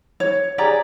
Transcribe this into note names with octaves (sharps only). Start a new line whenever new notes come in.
C#5
G4 G#4 D5 A#5